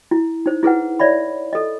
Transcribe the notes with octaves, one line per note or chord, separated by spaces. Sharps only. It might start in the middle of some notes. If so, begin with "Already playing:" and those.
E4
D#4 C5
E4 G#4 B4 F#5
C#5 D5 E5 B5
A4 D#5